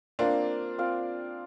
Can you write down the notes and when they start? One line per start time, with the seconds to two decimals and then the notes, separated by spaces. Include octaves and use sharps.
0.19 A#3 C4 D4 F4 D5 F5
0.78 C4 F4 D5 F5